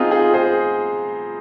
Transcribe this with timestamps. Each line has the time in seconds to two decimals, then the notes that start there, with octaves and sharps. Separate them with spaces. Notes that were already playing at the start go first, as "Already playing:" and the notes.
Already playing: B3 C4 D#4 F4 G#4
0.11 F4 G#4
0.34 G#4 C5